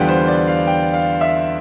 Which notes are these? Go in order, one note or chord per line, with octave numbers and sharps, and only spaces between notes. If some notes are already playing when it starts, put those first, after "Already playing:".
Already playing: E2 D3 G3 B3 F4 G5
C5
D5
F5
G5
F5
E5